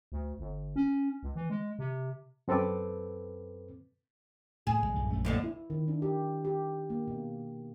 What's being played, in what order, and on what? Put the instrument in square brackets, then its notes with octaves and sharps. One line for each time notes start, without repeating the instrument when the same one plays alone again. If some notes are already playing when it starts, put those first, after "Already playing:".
[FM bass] D2
G1
C#4
C#2
E3
G#3
C3
[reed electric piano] F#2 C4 A4 B4 D6
[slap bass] A2 [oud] G#4
[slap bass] A#1 E2 G#3
B1 G2 A#2
A#1 F#2 A3
[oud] D#2 A2 D3
[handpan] E4
D#3
D4
G4
G4
A#3
B2